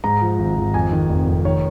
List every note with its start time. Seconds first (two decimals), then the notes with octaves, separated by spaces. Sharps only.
0.04 G#2 A#5
0.21 F3
0.39 G#1
0.57 G#1
0.74 F2 G#5
0.92 D#3
1.09 F1
1.27 F1
1.45 D#3 C#5